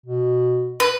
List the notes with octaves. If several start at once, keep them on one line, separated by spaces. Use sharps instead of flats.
B2
B4